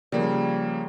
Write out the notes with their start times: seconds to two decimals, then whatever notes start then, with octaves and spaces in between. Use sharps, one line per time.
0.12 C#3 F3 G3 A#3